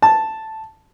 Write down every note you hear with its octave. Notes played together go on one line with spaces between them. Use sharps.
A5